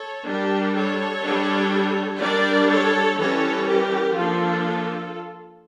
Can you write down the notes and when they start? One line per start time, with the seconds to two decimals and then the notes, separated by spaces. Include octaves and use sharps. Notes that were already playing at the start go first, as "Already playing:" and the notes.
Already playing: A4 C#5
0.26 G3 D4 G4 A#4
0.75 A4 C#5
1.23 G3 D4
2.21 G3 D4 A#4 D5
2.69 A4 C#5
3.17 E3 G3 C#4 A4 C#5
3.66 G4 A#4
4.15 F3 A#3 D4 F4 A4